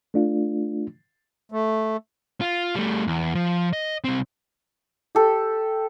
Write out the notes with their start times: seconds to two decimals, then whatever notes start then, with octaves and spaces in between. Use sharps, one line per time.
0.14 A3 D4 F4
1.52 A3
2.41 F4
2.75 G3 A3
3.08 E2
3.35 F3
3.73 D#5
4.04 C2 C4
5.15 G4 A4